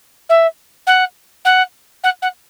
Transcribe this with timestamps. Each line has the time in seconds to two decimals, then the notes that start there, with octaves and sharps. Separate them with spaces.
0.29 E5
0.87 F#5
1.45 F#5
2.04 F#5
2.22 F#5